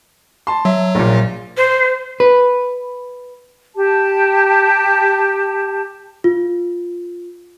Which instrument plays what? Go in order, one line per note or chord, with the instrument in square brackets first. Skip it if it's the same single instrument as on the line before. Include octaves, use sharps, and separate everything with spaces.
[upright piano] A5 C6
[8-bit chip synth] F#3 [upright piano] E5
[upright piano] A#1 A#2
[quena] C5
[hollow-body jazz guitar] B4
[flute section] G4 A5
[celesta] F4